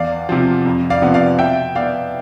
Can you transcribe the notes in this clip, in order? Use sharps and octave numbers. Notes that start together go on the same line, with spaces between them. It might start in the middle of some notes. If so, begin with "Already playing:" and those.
Already playing: E2 D5 F5
C3 F3
F2
D5 F5
C3 F3 B3
D5 F5
B2 E5 G5
B3 D5 F5